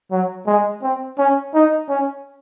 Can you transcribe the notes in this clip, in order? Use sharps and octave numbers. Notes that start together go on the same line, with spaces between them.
F#3
G#3
C4
C#4
D#4
C#4